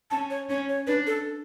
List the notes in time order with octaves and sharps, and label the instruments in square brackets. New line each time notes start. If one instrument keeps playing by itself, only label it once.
[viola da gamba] C#4 [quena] A5
[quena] C#5
[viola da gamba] C#4 [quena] C#5
[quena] C#5
[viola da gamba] D4 [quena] B4
[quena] A4